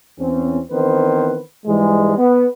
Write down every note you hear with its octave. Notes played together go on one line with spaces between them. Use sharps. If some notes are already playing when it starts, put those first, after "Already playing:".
E2 C4 C#4
D#3 E3 B3 C4 B4 C5
G#2 E3 G3 G#3
B3